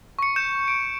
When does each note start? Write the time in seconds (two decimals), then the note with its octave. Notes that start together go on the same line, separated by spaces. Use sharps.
0.19 C#6 C#7
0.36 G6 C#7 E7
0.68 D7